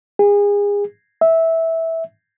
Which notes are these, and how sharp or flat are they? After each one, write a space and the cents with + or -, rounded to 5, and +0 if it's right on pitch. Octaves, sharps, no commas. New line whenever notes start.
G#4 -30
E5 -15